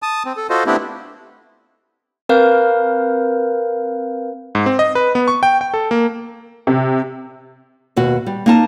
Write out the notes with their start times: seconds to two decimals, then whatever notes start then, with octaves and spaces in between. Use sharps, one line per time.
0.02 A5 D#6
0.26 C4
0.37 A4
0.50 F4 F#4 A4 C5 D#5
0.66 A3 B3 C4 D4 E4 G4
2.29 C4 A#4 B4 F5 G6
4.55 G#2
4.66 C4
4.79 D#5
4.95 B4
5.15 B3
5.28 C#6
5.43 G5
5.61 G5
5.74 A4
5.91 A#3
6.67 C3
7.96 D#2 B2 F#4
8.26 G3
8.46 A#3 D#4 A5